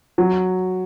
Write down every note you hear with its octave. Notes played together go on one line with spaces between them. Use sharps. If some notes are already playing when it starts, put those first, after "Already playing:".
F#3